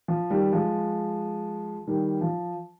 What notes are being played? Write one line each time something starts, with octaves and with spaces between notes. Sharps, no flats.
F3
D#3 G3
F3 G#3
D#3 G3
F3